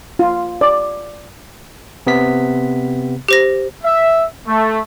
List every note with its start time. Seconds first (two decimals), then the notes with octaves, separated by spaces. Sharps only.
0.19 F4
0.61 D5
2.07 C3 B3 B6
3.28 G4 C5 A#6
3.84 E5
4.47 A3